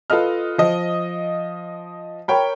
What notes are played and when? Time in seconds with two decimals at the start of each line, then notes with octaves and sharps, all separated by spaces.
0.10 F4 A4 B4 D#5 F6
0.58 F3 D#5
2.28 A#4 C#5 G5 B5